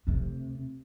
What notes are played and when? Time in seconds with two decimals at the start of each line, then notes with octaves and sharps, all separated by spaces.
0.07 D2 C3